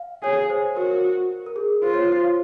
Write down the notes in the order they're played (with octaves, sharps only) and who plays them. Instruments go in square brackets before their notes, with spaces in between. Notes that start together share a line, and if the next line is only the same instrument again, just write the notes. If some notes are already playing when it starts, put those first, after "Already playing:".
Already playing: [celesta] F5
[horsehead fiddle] G#4 [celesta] C#5
[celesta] C5
[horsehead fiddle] F#4 [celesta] A#4
[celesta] A#4
G#4
[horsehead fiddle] F4 [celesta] C5
[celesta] C#5
C5